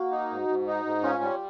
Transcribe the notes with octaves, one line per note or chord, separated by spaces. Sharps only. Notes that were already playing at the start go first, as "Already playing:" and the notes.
Already playing: A#3 F#4
D#4
G#2
G#2
D#4
G#2
C#4 F4
G3